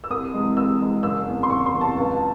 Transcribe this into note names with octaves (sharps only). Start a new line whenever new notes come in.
E6
C2 D#6
C3 E3 G#3
C2 E6
C3 E3 G#3
F#1 E6
E2 C3
C6
F#1 C#6
C6
E2 C3
A5
C#2